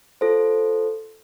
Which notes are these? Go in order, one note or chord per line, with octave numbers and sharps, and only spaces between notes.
F4 A4 C5